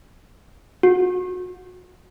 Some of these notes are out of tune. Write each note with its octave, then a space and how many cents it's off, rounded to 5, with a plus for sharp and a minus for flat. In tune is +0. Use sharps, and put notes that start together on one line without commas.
F#4 -25